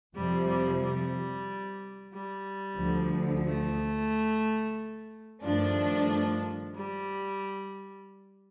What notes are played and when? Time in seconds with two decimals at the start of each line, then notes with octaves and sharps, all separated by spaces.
0.15 F2 C3 F3 G3
0.48 G3
0.82 G3
2.14 G3
2.79 D2 D3 F3
3.45 A3
5.43 G2 D#3 F3 A3 D4
6.75 G3